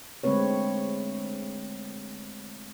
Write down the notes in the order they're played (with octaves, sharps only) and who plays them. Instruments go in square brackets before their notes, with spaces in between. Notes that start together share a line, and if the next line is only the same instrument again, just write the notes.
[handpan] D3 G#3 A3 C4 B4 C#5